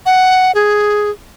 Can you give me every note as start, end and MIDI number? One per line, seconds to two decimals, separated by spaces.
0.06 0.52 78
0.55 1.10 68